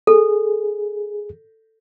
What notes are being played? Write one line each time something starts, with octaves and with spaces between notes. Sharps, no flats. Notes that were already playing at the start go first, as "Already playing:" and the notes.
G#4 A4